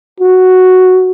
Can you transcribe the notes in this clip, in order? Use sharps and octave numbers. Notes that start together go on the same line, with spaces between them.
F#4